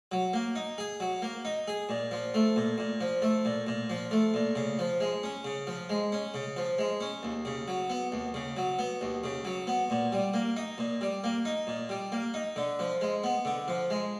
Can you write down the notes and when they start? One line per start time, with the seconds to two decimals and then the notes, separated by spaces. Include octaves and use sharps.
0.12 F#3
0.33 A#3
0.56 D#4
0.78 G#4
1.00 F#3
1.22 A#3
1.45 D#4
1.68 G#4
1.89 A#2
2.11 F3
2.34 A3
2.56 A#2
2.78 A#2
3.01 F3
3.22 A3
3.45 A#2
3.67 A#2
3.90 F3
4.11 A3
4.34 A#2
4.56 C#3
4.79 F3
5.00 G#3
5.23 C#4
5.45 C#3
5.67 F3
5.89 G#3
6.12 C#4
6.34 C#3
6.57 F3
6.78 G#3
7.01 C#4
7.23 D#2
7.45 C#3
7.68 F#3
7.90 B3
8.12 D#2
8.34 C#3
8.57 F#3
8.79 B3
9.01 D#2
9.24 C#3
9.45 F#3
9.67 B3
9.90 A#2
10.12 G3
10.34 A#3
10.57 D#4
10.78 A#2
11.01 G3
11.24 A#3
11.45 D#4
11.67 A#2
11.89 G3
12.12 A#3
12.34 D#4
12.56 D3
12.79 F3
13.01 G#3
13.24 B3
13.45 D3
13.68 F3
13.90 G#3